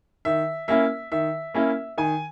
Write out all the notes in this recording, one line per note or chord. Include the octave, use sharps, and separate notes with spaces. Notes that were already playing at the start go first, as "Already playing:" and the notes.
D#3 E5
A#3 C#4 E4 E5
D#3 E5
A#3 C#4 E4
D#3 G#5